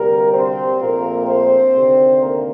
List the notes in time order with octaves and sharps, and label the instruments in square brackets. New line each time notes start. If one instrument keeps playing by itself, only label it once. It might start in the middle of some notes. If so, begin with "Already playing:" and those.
Already playing: [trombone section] D2 C3 G3 A#3 A#4
C4 C5
A#1 A#2 A3 A#3 C4 A#4
C4 C5
D2 C3 D#3
A#3 A#4